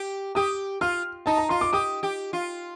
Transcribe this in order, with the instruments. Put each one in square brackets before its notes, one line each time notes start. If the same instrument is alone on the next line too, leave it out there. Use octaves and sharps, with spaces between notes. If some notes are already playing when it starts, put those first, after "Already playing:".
Already playing: [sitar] G4
[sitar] G4 [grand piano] D#6
[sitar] F4 [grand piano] F6
[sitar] D#4 [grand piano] A5
[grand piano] A#5
[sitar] F4 [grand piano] C6
[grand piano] D6
[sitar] G4 [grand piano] D#6
[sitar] G4
F4